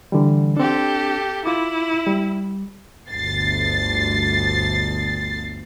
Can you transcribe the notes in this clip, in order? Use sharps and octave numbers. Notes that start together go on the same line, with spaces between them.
D3 E3 G3
C4 D4 G4 A4
E4 F4 D6
G3
G1 D2 A6 C7